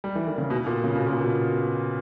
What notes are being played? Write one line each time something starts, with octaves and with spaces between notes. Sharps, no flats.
G3
E3
D#3
C#3
B2
A#2
C#3
B2
A#2
B2